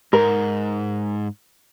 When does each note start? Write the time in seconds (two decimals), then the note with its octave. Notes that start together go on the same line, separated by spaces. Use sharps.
0.13 G#2 A#4